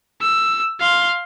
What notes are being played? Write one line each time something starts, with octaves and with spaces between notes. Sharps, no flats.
E6
F5 C6